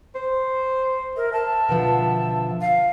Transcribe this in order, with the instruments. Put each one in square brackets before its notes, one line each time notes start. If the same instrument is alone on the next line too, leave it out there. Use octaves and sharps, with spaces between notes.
[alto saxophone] C5
[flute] A#4 [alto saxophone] E5
[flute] A5
[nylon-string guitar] B2 D3 F3
[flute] F5